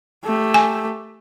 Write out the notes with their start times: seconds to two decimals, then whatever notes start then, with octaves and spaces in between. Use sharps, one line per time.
0.24 A3 G4
0.54 G#5